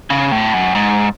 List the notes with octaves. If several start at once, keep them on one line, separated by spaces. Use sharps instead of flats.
C#3
A2
F#2
G#2